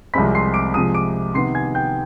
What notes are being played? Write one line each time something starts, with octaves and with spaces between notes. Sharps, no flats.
C2 C3 F3 G#3 C4 B5 B6
C6 C7
D6 D7
C3 F3 G#3 D#6 D#7
D6 D7
C3 D#3 B3 C6 C7
G#5 G#6
G5 G6